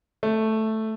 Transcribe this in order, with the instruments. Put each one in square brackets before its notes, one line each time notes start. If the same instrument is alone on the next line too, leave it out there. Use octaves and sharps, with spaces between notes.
[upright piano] A3